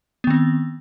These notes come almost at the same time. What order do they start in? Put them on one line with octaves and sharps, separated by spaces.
B3 D#3 C4